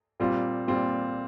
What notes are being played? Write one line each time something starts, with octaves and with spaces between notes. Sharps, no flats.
A#2 G3 C4 F4
A#2 G3 C4 F4